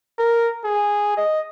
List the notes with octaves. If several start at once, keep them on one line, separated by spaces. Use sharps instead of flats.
A#4
G#4
D#5